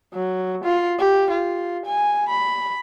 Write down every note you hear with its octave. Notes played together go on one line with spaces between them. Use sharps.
F#3
F4
G4
F4
G#5
B5